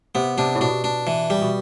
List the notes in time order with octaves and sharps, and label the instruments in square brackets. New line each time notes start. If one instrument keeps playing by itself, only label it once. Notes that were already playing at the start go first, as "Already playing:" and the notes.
[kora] C3 [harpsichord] B3
[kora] C3 [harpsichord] D4
[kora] A2
[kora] B2 [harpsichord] D4
[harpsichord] D4
E3
G3
[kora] B2